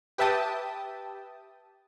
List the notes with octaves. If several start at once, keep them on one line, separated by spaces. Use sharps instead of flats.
G4 B4 E5 G5 A5 D#6